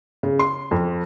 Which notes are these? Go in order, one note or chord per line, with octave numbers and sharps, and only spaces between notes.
C#3
C6
F2